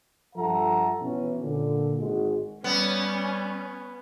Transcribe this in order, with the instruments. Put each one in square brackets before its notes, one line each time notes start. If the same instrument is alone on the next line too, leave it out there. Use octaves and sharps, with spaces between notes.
[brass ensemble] G2 F3 A4 E5 F#5 A#5
B2 E3 C#4
A#2 D3
G#1 G#3 F#4
[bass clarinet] G3 [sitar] B3 [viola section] C#4